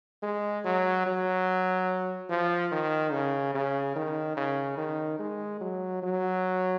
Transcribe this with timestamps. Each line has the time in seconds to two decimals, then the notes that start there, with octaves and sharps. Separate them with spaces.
0.23 G#3
0.65 F#3
1.06 F#3
2.29 F3
2.72 D#3
3.12 C#3
3.54 C#3
3.96 D#3
4.37 C#3
4.77 D#3
5.19 G#3
5.61 F#3
6.02 F#3